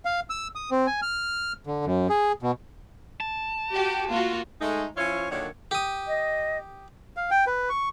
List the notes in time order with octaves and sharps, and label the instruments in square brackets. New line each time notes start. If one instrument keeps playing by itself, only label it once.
[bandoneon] F5
E6
D#6
C4
G#5
F6
D3
F#2
G#4
B2
[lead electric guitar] A5
[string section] F#4 G4
A#3 F4 F#4
[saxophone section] G#3 A3 D#4
F3 C#4 E4 F4 C#5
A#2 D3 D#3 F#3 D4 C#5
[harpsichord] G4 D#6
[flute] D#5
[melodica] F5
G5
B4
C#6